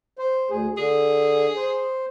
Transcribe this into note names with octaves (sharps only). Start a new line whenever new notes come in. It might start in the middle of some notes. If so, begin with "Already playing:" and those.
C5
D2 G#4
D3 G#4
C5